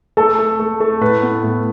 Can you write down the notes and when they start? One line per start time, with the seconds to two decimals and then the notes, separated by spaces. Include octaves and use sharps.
0.17 A3 A4
0.39 A3
0.60 A3
0.80 A3
1.01 A2 B4
1.22 B3
1.44 A2